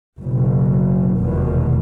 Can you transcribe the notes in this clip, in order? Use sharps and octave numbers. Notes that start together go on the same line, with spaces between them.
F#1 B2
F1 E2 B2 D#3